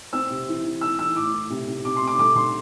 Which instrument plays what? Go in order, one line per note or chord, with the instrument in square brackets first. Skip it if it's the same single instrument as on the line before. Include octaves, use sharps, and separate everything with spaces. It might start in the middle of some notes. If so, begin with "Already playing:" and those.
[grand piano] C4 E6
C3
E3
E3
E3 E6
E3 E6
A2 D6
A2
C3
C3
C3 D6
C6
C3
D6
D3 D6
D3 C6